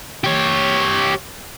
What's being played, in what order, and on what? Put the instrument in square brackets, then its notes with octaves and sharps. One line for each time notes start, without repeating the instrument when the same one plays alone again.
[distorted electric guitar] G4 C#5